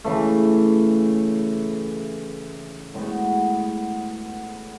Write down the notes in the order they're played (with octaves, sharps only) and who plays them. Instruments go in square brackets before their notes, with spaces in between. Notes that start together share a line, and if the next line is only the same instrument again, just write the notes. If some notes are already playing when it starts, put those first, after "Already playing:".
[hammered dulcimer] C#3 E3 A3
A2 G#3 B3 F#4